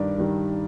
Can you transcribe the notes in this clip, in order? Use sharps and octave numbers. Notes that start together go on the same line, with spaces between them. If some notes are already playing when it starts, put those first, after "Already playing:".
Already playing: G2 D#3 G3 D4 A#4 D5
D#3 G3